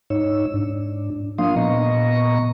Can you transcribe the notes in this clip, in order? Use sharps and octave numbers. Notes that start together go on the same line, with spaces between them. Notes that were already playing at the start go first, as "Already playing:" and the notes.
G#2 D#4 C#5 E6
G#2 D4
F3 A#3 D4 F5 C6 D#6
A#2 B3 D#5 A#5 C#6